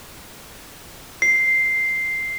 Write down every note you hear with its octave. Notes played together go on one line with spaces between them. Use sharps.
C7